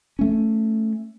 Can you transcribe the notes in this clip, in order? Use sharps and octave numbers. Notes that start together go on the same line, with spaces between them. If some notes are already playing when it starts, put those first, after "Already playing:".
A3 C#4